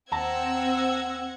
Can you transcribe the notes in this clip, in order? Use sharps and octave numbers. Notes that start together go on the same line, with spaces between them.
D#2 C4 F#5 A5 A#5 E6 G#6 A#6